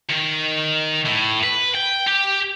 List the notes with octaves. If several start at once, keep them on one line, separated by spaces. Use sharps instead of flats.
D#3
A2
B4
G5
G4